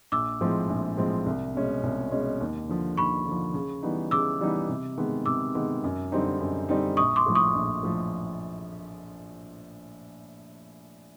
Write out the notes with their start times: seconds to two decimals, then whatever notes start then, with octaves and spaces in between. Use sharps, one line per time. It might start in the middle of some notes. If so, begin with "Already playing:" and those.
0.12 A#1 D6 E6
0.41 A2 F3 G#3 C4
0.69 A#1
0.97 A2 F3 G#3 C4
1.26 C2
1.55 B2 G#3 C#4
1.83 C2
2.12 B2 G#3 C#4
2.41 D#2
2.69 D3 F3
2.97 D#2 B5 C#6
3.27 D3 F3
3.54 C#3
3.83 E3 G3 B3 D#4
4.11 C#3 D6 E6
4.41 E3 G3 B3 D#4
4.69 C3
4.98 D#3 G#3 B3
5.26 C3 D6 E6
5.54 D#3 G#3 B3
5.84 F#2
6.12 D3 G3 C4 D#4
6.40 F#2
6.69 D3 G3 C4 D#4
6.97 A#1 C#6 D#6
7.16 C6 D6
7.26 A2 F3
7.35 C#6 D#6
7.55 A#1
7.83 A2 F3